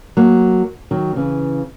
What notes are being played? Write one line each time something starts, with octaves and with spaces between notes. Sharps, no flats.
F#3 A#3
D#3 F#3
C#3 E3